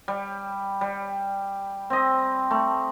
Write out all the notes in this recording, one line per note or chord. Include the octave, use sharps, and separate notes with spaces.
G3
G3
C4 D#5
A3